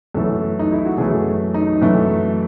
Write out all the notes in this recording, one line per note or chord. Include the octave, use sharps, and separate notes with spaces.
F#2 E3 A3 A4
D#4
E4
F#4
F#2 E3 A3 G#4
D#4
F#2 E3 A3